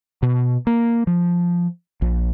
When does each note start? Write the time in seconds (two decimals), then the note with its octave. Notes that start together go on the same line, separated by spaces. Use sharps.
0.23 B2
0.67 A#3
1.07 F3
2.02 A#1